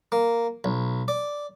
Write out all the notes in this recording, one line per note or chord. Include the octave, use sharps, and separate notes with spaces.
A#3
B1
D5